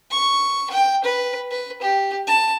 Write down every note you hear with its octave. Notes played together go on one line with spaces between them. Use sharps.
C#6
G5
B4
B4
G4
A5